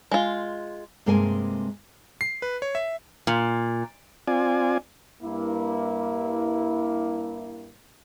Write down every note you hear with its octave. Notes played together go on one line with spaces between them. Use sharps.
G#3 F4
G2 C3 G#3 A#3 A#4 G#5
C7
B4
C#5
E5
A#2
C4 F4 D5 G#5
G2 A#3 E4